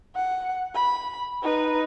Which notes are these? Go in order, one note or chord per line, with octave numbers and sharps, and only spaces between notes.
F#5
B5
D#4 B4